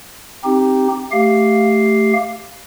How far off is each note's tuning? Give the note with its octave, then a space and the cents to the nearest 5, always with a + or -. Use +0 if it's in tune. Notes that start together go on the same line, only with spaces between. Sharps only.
C4 +0 D#4 +0 G4 +0
A3 +0 G4 +0 F5 +0